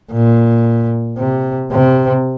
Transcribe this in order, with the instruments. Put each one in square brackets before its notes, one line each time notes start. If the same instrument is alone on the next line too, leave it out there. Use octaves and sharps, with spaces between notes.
[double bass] A#2
C3
C3